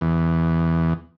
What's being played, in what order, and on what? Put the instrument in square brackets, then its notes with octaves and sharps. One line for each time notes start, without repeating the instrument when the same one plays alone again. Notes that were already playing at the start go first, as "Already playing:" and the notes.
[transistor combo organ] E2